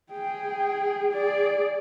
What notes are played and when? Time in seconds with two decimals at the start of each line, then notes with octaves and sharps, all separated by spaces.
0.12 G#4 G5
1.12 G#4 D5